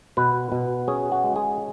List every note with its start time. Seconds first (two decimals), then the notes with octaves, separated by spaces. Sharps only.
0.17 B2 B4
0.52 B2
0.88 C#4 G#4
1.12 F#4
1.24 G#3
1.36 G#4